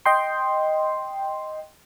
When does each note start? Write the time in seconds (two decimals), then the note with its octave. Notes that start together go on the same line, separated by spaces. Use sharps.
0.06 D#5 G5 C6